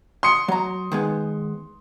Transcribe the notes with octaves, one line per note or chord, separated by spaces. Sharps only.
C6 D#6 C#7
F#3 A#5
D#3 G#3 B3